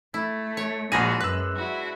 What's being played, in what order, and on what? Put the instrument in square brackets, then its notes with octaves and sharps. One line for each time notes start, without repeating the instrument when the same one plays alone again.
[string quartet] A3 [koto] E4
[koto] C#5
[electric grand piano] A#1 A#6 D#7 [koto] G#3 G#4 [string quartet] F#4 A5 B5
[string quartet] F#2 [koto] B4 [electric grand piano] E6 F#6
[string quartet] D4 E4 F#4